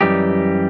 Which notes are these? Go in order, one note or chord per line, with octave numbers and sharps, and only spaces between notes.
F#2 E3 G3 D#4 G4